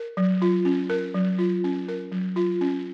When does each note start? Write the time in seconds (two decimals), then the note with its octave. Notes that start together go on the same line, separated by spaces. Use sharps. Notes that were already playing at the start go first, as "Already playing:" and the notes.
Already playing: A#4
0.17 F#3
0.42 F4
0.65 C#4
0.90 A#4
1.14 F#3
1.39 F4
1.64 C#4
1.88 A#4
2.12 F#3
2.36 F4
2.61 C#4